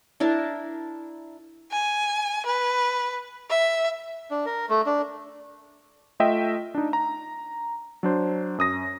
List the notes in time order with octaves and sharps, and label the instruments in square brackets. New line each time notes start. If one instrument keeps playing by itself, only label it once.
[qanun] D4 E4 A#4 A5
[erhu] G#5
B4
E5
[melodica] D4
A#4
A3
D4
[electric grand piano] A3 F4 D#5 E5 G5
D4 D#4
A#5
F#3 D4 C5
F#2 D#6 A#6